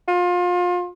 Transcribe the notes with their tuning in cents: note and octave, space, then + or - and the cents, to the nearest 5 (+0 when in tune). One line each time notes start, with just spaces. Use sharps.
F4 +30